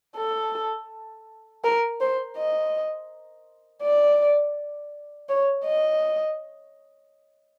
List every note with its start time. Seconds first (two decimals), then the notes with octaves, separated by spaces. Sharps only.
0.17 A4
1.64 A#4
2.01 C5
2.37 D#5
3.83 D5
5.29 C#5
5.66 D#5